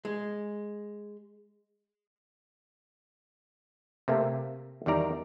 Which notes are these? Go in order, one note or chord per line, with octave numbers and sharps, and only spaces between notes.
G#3
C3 A3 A#3 G4
E2 D#3 G3 D5 A#5